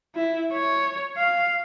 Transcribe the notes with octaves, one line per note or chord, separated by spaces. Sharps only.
E4
C#5
F5